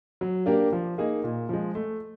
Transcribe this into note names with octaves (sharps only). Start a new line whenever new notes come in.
F#3
A#3 D4 G4 A#4
F3
A#3 D#4 G#4
A#2
F3 G#3
A3